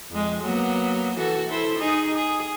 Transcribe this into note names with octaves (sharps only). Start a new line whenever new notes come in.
F2 G#3
F#3 A#3 B3
E3 F#4 A4
E4 A4 C5
D#4 G#4
G#4